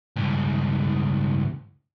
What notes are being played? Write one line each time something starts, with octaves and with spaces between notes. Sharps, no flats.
C#2 G2